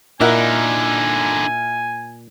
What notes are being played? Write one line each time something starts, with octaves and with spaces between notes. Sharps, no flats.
A#2 D3 D#4 E4 A#4 F#5 G#5